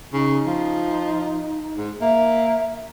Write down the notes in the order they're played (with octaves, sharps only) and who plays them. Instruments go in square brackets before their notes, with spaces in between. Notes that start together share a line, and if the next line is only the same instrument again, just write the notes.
[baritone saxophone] C#3 [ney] D#4
[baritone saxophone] F3
G#2
[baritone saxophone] A#3 [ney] E5